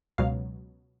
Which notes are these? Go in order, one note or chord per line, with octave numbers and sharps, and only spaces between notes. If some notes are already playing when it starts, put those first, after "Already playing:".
C#2 B2 F#3 F5